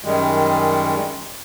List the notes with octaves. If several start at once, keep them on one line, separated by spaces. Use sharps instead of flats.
F#2 D#3 G3 G#3